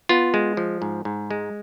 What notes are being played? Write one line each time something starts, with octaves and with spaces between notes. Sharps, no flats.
B3 F4
G#3
F3
G#2
G#2
G#3